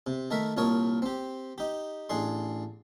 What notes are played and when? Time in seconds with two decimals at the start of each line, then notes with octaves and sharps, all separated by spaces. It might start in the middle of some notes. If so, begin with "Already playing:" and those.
0.07 C3
0.30 D#3 A3 A#4 E5
0.57 C2 A#2 A#4 C#5 A5 D#6
1.02 C4 G4
1.58 D#4 G4
2.09 A1 D4 G#4 C6